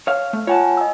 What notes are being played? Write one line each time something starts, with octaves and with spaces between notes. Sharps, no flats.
C#5 F5 F6
A3
F4 C#5 F#5 G#5 A5
D#5 E6